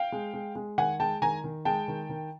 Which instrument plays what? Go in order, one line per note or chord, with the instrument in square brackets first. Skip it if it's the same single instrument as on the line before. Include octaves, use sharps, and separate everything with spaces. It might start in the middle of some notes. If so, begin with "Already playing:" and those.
Already playing: [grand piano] F5 G5
G#3
G#3
G#3
D#3 F#5 G#5
G#3 G5 A5
D#3 G#5 A#5
D#3
G#3 G5 A5
D#3
D#3